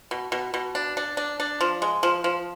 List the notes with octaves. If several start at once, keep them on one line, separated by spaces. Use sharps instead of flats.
B2
B2
B2
D4
D4
D4
D4
F3
G#3
F3
F3